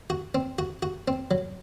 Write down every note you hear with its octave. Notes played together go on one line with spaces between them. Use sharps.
F#4
C4
F#4
F#4
C4
F#3